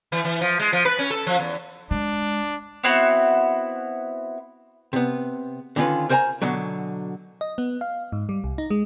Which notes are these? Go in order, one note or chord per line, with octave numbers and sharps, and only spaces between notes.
E3
E3
F3
G#3
F3
B4
C#4
A4
F3
E2
G#3 D4
B3 C4 E4 F#4
C3 B3
D3 D#3 C#4 E4 F4 B4
A#4 C5 C#5 G5 G#5 A#5
B2 D3 F#3
D#5
B3
F5
G#2
G3
C2
D#4
G#3